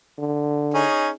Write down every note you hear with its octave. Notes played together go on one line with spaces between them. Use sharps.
D3
C#4 D#4 G#4